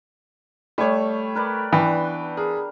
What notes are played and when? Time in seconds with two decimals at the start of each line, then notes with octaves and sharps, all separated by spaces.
0.78 G3 A3 C#5
1.35 A#4 B4 D5
1.73 E3 B3 D4 G5 C#6
2.37 G#4 A#4